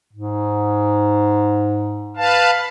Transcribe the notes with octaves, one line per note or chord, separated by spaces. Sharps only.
G#2
B4 F5 A5